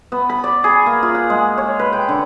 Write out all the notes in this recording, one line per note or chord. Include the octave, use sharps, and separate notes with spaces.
B3
B5
D5
G#4
A#3
F4
F#5
G#3
C#5
B4
G5
D3